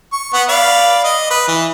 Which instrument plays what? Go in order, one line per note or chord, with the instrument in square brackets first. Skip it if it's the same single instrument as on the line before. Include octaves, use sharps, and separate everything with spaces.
[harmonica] C#6
B3 F#5
D5 F5 B5
D#5
B4
E3